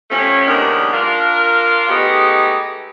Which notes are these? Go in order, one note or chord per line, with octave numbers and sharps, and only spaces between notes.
F3 G3 A3 C#4
E2 A#2 D#3 F3 G3 D4
D4 F4 A#4
G#3 A3 B3 D#4 G4